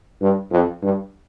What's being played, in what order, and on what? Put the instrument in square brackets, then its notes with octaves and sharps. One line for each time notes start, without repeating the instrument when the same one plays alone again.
[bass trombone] G2
F2
G2